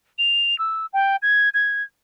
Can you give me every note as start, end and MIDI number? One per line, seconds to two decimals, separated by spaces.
0.18 0.58 101
0.59 0.86 88
0.93 1.16 79
1.22 1.49 92
1.54 1.83 92